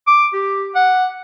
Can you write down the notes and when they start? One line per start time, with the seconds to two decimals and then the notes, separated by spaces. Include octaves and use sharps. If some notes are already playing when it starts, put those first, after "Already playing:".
0.07 D6
0.34 G4
0.75 F#5